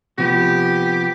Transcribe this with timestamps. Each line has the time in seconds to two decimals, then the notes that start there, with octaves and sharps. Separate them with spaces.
0.18 C3 F3 B3 G4